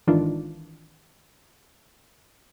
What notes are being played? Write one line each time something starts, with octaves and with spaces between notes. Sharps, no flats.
G#1 D#3 E3 D4 F4